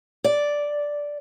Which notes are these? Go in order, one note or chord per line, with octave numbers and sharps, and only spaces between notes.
D5